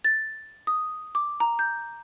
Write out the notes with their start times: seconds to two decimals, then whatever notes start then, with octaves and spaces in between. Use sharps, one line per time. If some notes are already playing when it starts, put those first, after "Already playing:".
0.05 A6
0.67 D#6
1.15 D6
1.40 A#5
1.59 G6